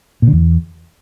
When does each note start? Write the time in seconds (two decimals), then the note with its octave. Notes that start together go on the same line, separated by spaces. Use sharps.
0.22 A#2
0.27 D3
0.33 E2